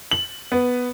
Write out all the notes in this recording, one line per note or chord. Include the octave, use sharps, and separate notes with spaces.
F#7
B3